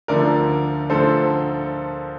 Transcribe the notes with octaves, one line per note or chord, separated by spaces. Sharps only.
D2 D3 F3 A#4 D5
D2 D3 F3 A4 C5